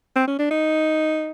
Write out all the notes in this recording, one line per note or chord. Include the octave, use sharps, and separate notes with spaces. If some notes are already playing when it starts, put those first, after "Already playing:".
C4
C#4
D4
D#4